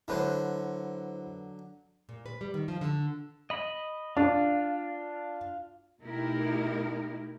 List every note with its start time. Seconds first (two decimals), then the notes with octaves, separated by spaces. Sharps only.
0.08 D3 F#3 E4 B4 C5
2.09 A#2
2.26 B4
2.41 G3
2.54 D#3
2.68 F3
2.81 D3
3.50 D#5 B5
4.17 D4 F4
6.01 B2 A3 D#4 E4 G4 A#4